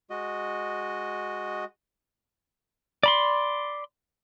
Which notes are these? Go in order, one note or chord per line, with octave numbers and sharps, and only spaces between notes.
G#3 F#4 D#5
D5 B5 C6